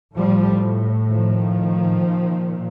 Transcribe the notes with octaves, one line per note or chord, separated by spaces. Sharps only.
A2 F3 G3
D#3 F3
A#2